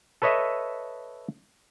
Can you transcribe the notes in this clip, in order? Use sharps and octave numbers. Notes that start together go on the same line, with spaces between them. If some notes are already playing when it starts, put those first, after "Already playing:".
A4 B4 C#5 D#5 E5